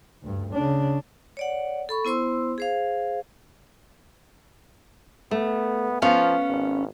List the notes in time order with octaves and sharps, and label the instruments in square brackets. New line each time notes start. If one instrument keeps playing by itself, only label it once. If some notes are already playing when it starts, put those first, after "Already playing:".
[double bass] D2 G2
C#3 D4
[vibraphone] C#5 D5 F#5
A4 B5 C#6
B3 E4 C5 C6 E6
G#4 C5 F5
[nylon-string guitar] A3 [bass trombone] B3
[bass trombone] F3 [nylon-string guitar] B3 C#4 F5
[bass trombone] G#1